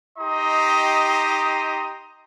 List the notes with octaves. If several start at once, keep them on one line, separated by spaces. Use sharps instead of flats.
D#4 G4 D#5 A#5 C6 D#6